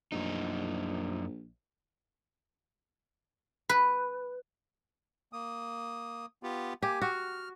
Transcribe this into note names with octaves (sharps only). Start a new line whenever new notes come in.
A#1 F#2 D#4
B4
A#3 D#6
B3 F4 G4
A#3 G4 G#5
F#4 F6